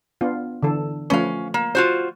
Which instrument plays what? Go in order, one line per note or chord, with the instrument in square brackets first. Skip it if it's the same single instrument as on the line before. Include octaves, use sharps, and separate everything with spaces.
[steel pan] B3 D4 F4
D3 E3 A4
[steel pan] F3 A3 B4 [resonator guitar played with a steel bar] C#4 F5
[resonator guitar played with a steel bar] A#3
F4 F#4 C5